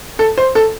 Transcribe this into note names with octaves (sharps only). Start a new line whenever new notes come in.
A4
C5
A4